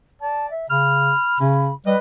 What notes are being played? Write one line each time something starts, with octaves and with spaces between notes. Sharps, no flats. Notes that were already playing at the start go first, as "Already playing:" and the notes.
D5 A5
E5
C#3 B5 F6
C#3 C#4
G3 B4 D#5